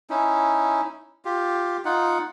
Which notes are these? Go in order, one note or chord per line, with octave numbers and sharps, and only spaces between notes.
C#4 D#4 E4
F4 G4
D#4 F4 F#5